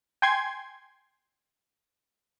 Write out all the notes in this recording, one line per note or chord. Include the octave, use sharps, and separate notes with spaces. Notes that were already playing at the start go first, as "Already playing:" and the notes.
G5 G#5 C6 G#6